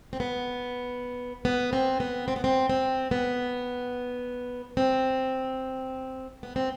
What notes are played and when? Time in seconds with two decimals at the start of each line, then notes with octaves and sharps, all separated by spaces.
0.13 C4
0.20 B3
1.45 B3
1.73 C4
2.00 B3
2.28 C4
2.36 B3
2.44 C4
2.69 C4
3.11 B3
4.77 C4
6.43 B3
6.56 C4